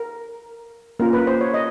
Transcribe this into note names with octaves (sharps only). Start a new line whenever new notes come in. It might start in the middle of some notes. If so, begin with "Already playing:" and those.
Already playing: A#4
A#3 C#4 F4 A#4
B4
C5
C#5
D#5